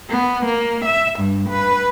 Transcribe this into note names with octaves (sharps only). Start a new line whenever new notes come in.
B3
A#3
E5
G2
B4